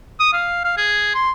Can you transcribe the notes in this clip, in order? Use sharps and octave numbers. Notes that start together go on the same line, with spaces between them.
D#6
F5
F5
G#4
C6